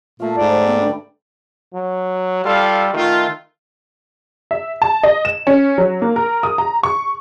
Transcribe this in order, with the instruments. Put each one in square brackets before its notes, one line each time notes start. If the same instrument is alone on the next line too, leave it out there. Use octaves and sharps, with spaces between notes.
[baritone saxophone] A#2 [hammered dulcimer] A3 F5 [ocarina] F4
[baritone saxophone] G#2 [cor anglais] D5
[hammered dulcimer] F#3 G5 [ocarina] C5
[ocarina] B3
[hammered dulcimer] D3 G3 B4 [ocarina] D4
[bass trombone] F#3
[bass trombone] G3 [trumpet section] F4 A4 F5
[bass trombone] D#3 [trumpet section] A3 F4
[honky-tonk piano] E5
A5
D#5
E7
C#4
F#3
A#3
A#4
D#6
A#5
C#6